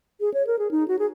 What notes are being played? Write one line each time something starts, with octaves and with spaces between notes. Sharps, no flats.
G#4
C#5
A#4
G#4
D#4
F#4
G#4